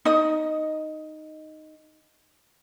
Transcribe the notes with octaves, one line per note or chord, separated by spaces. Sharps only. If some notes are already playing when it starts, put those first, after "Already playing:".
D#4 D#5